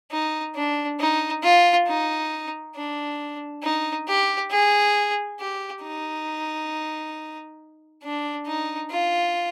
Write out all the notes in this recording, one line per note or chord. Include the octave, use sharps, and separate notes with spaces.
D#4
D4
D#4
F4
D#4
D4
D#4
G4
G#4
G4
D#4
D4
D#4
F4